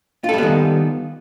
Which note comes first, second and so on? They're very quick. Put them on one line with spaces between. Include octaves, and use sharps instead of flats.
F4 A4 G3 B3 D#3